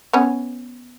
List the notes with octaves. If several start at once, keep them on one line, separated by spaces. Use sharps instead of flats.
B3 C#4